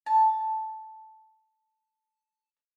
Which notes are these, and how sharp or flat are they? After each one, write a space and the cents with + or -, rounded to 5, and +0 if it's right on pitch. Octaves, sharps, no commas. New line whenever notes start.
A5 -5